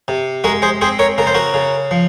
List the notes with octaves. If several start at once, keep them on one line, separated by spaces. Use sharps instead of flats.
C3
G#3 F#4 A#4
G#4 C5
C4 G#4 C5
A#4 C#5
C#3 A#4
C5
F#4 A#4
C#3
F3